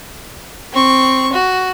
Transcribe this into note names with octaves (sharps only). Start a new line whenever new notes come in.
C4 C#6
F#4